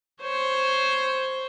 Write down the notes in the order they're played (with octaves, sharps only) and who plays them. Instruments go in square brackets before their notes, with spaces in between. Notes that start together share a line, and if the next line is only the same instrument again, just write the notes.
[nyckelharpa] C5 C#5